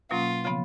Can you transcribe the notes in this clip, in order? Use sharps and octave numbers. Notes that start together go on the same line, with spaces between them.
B2 F#3 A#3 C#4 F4
C#3 F3 B3